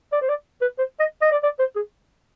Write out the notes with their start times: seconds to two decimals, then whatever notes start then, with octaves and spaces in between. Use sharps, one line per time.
0.12 D5
0.21 C5
0.29 D5
0.61 B4
0.78 C5
1.00 D#5
1.22 D#5
1.32 D5
1.43 D5
1.59 C5
1.76 G#4